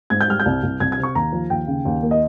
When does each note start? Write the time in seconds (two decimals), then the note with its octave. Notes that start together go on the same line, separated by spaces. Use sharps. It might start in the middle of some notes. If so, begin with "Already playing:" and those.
0.10 G#2 G#6
0.21 G6
0.28 G3 F6
0.40 G6
0.46 C2
0.63 C2
0.80 C2 G#6
0.92 G#6
0.98 C3
1.03 C#6
1.15 D#2 A#5
1.32 F3
1.50 D#2 G5
1.67 C#3
1.85 D#2
2.03 A#3
2.11 D#5